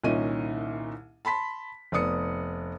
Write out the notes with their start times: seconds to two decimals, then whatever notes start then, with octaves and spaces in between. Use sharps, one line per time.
0.04 C2 A#2 D#3 C#4 D#5 D#7
1.25 A5 B5 C6 B6
1.92 F1 B3 D5 D#6 C#7